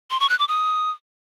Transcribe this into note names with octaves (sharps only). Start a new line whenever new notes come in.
C6
C#6
F#6
D6
D#6